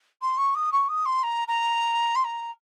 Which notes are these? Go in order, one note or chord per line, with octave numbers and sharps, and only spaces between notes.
C6
C#6
D#6
C#6
D#6
C6
A#5
A#5
C6
A#5